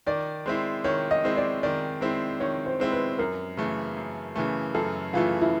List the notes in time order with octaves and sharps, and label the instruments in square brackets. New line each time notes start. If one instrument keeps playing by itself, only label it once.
[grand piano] D#3 [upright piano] D5
[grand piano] G#3 C4 E4
[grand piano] D#3 [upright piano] C#5
[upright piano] D#5
[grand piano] G#3 C4 E4
[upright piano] D5
[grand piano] D#3 [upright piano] D5
[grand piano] G#3 C4 E4
[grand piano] D#3 [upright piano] C#5
[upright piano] C5
[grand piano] G#3 C4 E4
[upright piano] B4
[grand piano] F#2 [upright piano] A#4
[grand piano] C#3 E3 A3
F#2
C#3 E3 A3
[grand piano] F#2 [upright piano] A4
[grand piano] C#3 E3 A3 [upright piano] F4
[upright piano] E4